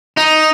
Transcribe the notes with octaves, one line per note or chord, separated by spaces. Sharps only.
D#4